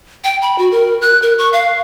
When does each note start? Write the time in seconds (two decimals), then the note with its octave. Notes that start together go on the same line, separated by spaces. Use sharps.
0.24 G5
0.42 B5
0.58 F#4
0.72 A#4
1.02 F#6
1.22 A#4
1.38 C#6
1.53 F5